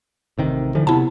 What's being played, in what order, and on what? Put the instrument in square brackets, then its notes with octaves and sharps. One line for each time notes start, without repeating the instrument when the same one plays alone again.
[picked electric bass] A1 C3 D#3
D3 E3 F3
[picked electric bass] C3 B3 [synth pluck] E4 A5